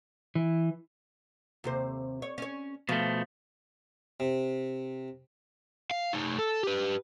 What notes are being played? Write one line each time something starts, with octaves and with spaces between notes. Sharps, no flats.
E3
D#2 C3 C5
C#5
C#4 C#5
B2 F3 A3
C3
F5
A3 D#4
A4
G4 B4